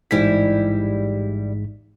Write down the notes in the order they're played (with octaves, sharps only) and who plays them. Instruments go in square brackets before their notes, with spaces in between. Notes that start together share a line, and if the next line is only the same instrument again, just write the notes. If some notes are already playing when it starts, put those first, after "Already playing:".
[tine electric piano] A1 G#2 B6 [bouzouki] G3 E4